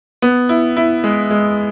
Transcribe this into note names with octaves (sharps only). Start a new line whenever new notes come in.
B3
E4
E4
G#3
G#3